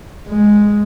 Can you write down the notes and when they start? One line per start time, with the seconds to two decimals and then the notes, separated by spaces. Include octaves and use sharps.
0.28 G#3